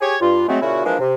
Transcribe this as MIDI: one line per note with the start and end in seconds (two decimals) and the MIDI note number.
0.01 0.16 67
0.01 0.16 68
0.01 0.16 73
0.21 0.45 43
0.21 0.45 65
0.48 0.59 54
0.48 0.59 56
0.48 0.59 57
0.48 0.59 60
0.61 0.83 46
0.61 0.83 49
0.61 0.83 61
0.61 0.83 64
0.61 0.83 66
0.85 0.95 52
0.85 0.95 53
0.85 0.95 56
0.85 0.95 58
0.85 0.95 62
0.99 1.14 48